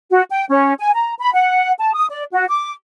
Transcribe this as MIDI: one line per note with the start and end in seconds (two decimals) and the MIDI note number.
0.10 0.22 66
0.30 0.45 79
0.49 0.73 61
0.79 0.91 80
0.94 1.13 82
1.19 1.32 83
1.34 1.73 78
1.79 1.92 81
1.93 2.06 87
2.09 2.24 74
2.32 2.46 66
2.49 2.73 86